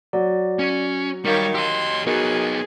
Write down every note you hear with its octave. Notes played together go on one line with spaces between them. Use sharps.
F#3 D5
C#4
D#3 G3 C#5 F5 C#7
G4 D#5 C6 E6
B3 D#4 F#4 G#4 A#4 D#5